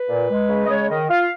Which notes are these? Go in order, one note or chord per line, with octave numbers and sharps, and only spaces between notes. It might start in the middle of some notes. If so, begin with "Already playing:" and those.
Already playing: B4
A#2
G#3
C#3
D#5
G#3 C#5
D#3 D#5
F4 F5